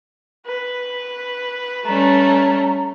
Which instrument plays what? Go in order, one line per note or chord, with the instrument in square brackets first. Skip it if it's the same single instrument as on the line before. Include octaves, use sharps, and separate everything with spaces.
[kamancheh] B4
[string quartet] G3 A3 C#4 [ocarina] A#5